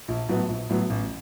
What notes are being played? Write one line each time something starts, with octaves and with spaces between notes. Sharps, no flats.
A#1
A2 F#3 B3
A#1
A2 F#3 B3
A1